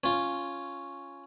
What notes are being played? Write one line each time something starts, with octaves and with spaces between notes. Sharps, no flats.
C#4 F4